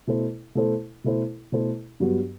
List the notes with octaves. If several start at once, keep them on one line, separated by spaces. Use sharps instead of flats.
B2 A3 E4 A4 C5
B2 A3 E4 A4 C5
B2 A3 E4 A4 C5
B2 A3 E4 A4 C5
G2 F#3 B3 F#4